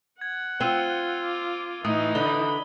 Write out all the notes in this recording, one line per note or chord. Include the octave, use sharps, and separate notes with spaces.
F#5 G#6
C4 F4 E6 D#7 G7
D6
A2 E3 D#4 D#6
D3 B5 G7